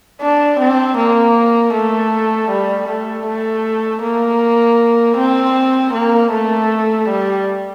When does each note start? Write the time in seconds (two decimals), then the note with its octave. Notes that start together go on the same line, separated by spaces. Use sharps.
0.21 D4
0.59 C4
0.97 A#3
1.73 A3
2.50 G3
2.88 A3
3.26 A3
4.02 A#3
5.17 C4
5.93 A#3
6.32 A3
7.08 G3